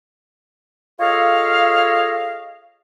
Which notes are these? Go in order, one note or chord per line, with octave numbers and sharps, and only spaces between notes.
F4 G#4 A4 C#5 D#5 F5